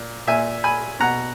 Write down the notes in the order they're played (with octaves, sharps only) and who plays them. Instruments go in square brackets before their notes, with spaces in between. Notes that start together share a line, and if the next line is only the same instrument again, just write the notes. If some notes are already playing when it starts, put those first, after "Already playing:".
Already playing: [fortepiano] A#2
A#2 E5 G#5
G#5 B5
B2 F#5 A#5